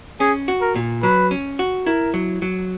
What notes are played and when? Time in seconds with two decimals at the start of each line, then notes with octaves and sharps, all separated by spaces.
0.20 C#4 G#4
0.48 F#4
0.61 A#4
0.75 A#2
1.03 F#3 B4
1.31 C#4
1.59 F#4
1.86 E4 A#4
2.14 F#3
2.42 F#3